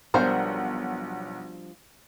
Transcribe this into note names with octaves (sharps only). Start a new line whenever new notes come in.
B1 F3 G3 D4 A#4 C5 F#5